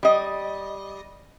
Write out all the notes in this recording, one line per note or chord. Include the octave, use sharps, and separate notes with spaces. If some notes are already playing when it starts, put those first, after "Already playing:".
G3 D#5